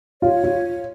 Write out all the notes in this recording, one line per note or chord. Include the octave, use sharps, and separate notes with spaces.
F4 C#5
F4